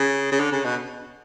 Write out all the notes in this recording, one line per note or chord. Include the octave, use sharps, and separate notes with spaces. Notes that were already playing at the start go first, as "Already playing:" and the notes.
Already playing: C#3
C#3
D3
C#3
B2